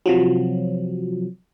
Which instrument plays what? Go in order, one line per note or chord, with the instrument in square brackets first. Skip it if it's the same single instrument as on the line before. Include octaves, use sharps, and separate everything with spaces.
[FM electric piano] C3 F3 F#3